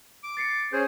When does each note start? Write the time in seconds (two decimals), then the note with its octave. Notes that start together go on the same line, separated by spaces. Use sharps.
0.23 D6
0.37 A6 C7 C#7
0.73 C#4 G#4 C5 G6